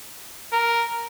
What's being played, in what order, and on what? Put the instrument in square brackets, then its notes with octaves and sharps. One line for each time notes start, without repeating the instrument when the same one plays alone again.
[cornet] A#4